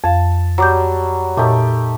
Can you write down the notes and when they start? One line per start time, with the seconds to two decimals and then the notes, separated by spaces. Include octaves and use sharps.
0.04 F2 F5 A5
0.58 F#3 G3 A#5 D6 G6
1.37 A#2 A3 D#4 G4